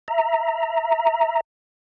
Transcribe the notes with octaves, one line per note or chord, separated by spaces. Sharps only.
E5 A#5